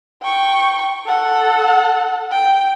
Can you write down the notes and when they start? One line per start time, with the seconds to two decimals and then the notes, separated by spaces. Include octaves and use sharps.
0.22 G5 C#6
1.06 A4 F#5
2.31 G5